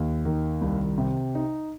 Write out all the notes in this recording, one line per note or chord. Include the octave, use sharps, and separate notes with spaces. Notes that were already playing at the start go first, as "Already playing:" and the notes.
Already playing: D#2
D#3
C2
C3
D#4